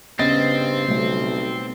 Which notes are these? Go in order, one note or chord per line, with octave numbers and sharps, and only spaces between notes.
G2 C#3 B3 C4 D#5 A6
B1 B2 G3 A3